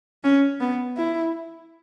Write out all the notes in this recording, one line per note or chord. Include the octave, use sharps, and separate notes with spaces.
C#4
B3
E4